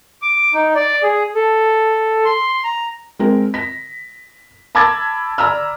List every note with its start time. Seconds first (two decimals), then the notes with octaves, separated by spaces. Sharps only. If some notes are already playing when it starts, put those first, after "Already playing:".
0.22 D6
0.54 D#4
0.75 D5
1.03 G#4
1.35 A4
2.25 C6
2.64 A#5
3.19 G#3 C4 A#4
3.54 A#6 B6
4.75 A5 B5 D6 E6 G#6 A6
5.38 D5 A#5 B5 E6 F6